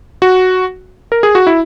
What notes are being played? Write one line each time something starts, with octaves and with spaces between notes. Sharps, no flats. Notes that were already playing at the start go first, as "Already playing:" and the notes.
F#4
A#4
G#4
F#4
E4